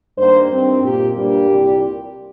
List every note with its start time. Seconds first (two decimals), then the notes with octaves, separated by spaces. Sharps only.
0.17 G2 D#3 G3 A#3 C5
0.51 G2 D#3 C4
0.83 A#2 A#3 G4
1.16 G2 G3 A#3 G4
1.49 C2 A#2 G3